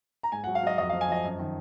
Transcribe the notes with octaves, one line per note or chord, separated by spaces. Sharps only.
A#5
G#2 G#5
F#5
F#3
F5
F#3 D#5
F2 D#5
F5
F3
G#5
F3 D#5
F#2
D#3